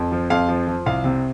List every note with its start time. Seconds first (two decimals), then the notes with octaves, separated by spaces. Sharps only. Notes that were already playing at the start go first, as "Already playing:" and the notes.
Already playing: F2
0.12 F3
0.30 F2 F5
0.49 F3
0.67 F3
0.86 C2 F5
1.04 C3